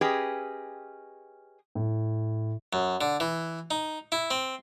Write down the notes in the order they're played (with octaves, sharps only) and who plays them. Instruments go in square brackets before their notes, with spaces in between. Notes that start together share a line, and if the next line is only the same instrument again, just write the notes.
[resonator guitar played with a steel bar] C#4 G4 G#4 B4 D#5 G5
[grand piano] A2
[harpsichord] F#2
D3
E3
D#4
E4
C4